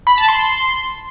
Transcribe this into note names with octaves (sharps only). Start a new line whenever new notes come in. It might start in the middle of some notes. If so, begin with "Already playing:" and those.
B5
A5
C6